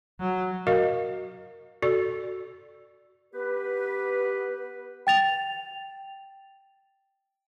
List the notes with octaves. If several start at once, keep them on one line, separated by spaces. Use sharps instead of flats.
F#3
F#4 A#4 D#5 F5
F#4 A4 D5
B3 G4 B4
G5 A6 F7